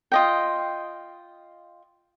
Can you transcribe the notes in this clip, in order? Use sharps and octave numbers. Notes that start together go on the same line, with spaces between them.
F4 D#5 G5